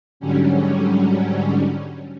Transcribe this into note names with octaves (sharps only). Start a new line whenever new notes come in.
G#2 D3 F#3 G3 C#4